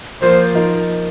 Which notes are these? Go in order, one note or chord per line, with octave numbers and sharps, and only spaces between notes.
F3 A#3 F4 C5
F3 D#4 A#4